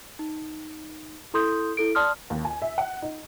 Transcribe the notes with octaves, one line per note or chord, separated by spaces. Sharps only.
D#4
E4 A4 C6 D#6 G6
E4 A4 D7
D5 A5 C6 D#6 F6
D#2
G#5
E5
F#5
D#4